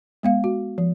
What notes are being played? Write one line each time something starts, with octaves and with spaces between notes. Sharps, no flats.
G#3 B3 F5
F#4
F3